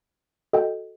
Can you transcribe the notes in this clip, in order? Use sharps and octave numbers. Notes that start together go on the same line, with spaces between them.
F#4 A4 D#5 G5